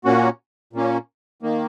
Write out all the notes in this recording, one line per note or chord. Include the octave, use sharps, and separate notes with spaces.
A#2 A#3 C#4 F#4
A#2 A#3 C#4
D#3 A#3